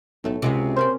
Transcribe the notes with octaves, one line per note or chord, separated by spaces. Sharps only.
B1 A2 A3 A4
C#2 C3 G#3 F#4 G#4
A#3 C#4 C5 D5